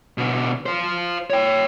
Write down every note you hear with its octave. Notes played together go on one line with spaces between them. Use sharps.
B2 D3
F4 C5
C#5 G5